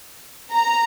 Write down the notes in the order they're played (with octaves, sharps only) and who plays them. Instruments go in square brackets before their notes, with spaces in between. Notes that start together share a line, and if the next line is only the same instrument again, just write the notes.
[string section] A#5